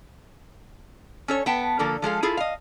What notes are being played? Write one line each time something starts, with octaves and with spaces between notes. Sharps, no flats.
C#4 A4 C#5
B3 B4 G5 A5
D3 F3 A#3 A4
F3 G#3 A4 F5
E4 F4 G#4 A4
D#5 F5